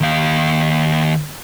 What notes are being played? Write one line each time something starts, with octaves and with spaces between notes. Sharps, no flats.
D#2 F5